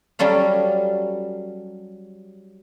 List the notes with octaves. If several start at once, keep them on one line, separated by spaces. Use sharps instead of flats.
F#3 G3 C#4 A4 F5